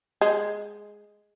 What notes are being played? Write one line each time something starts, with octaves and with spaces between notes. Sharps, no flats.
G#3